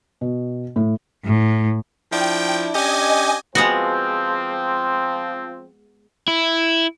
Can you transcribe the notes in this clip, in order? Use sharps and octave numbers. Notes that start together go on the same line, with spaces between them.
B2
A2
A2
F3 D4 E4 G5
C#4 D4 G4 D#5 G#5
F3 G#3 B3 C4 F#4
E4